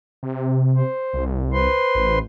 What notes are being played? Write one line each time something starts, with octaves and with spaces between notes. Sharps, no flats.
C3
C5
C2
B4 C5 C6
A1